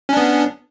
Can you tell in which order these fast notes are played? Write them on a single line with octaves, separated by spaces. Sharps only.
C#4 D4 B3